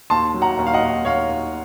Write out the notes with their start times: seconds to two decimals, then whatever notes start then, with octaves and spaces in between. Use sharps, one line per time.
0.10 D#2 A5 C6
0.34 F#3
0.42 F#5 A#5
0.58 D#2
0.66 F5
0.74 D#5 F#5
0.82 D#2
1.05 D#2 C#5 F5
1.29 D#2